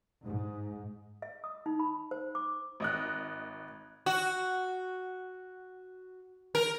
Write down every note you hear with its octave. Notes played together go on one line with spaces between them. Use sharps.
G#2
D#5
D#6
D#4
B5
C5
D6
G#1 D#5 F#6
F#4
A#4